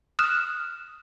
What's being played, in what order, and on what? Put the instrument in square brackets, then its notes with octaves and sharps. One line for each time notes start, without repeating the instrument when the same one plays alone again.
[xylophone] D#6 F6 F#6 E7